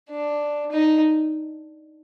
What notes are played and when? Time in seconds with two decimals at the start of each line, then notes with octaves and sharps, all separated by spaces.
0.10 D4
0.72 D#4